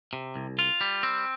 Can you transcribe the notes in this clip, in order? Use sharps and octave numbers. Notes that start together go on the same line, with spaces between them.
C3
C2
F4
G3
C4